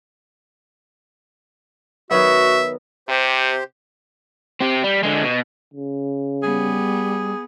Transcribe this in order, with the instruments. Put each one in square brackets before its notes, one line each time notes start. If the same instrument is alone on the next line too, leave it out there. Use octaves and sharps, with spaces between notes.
[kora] D#3 F#3 B3 [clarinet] F#4 [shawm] E5
[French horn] C3 [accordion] G4 C5
[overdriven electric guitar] C4 G4
G3
D3 G#3
B2
[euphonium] C#3
[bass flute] G3 [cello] B3 [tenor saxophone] G#4